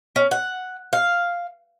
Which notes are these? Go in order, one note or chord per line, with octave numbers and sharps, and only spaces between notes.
C#4
F#5
F5